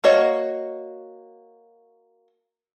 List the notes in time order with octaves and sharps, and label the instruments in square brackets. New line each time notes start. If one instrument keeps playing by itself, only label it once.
[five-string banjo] A#3 F#4 C#5 D#5